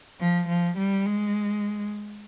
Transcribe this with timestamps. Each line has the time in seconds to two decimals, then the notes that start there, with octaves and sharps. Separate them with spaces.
0.20 F3
0.48 F3
0.77 G3
1.06 G#3